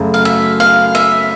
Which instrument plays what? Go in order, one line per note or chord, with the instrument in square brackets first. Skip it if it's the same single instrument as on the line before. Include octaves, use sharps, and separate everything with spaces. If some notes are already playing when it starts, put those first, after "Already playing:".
Already playing: [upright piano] F#2 C#3 F#3 A3
[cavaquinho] F5
E5
F5
E5